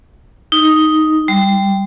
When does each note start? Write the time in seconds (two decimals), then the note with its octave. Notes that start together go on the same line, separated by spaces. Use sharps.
0.52 D#4
1.28 G3